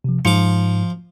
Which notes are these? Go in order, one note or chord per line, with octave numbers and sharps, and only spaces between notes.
C3 F3
G#2 F3 D6 C#7